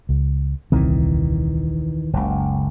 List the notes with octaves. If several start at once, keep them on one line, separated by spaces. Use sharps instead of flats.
C#2
D#1 C2 D#3 E3 C4
F#1 C#2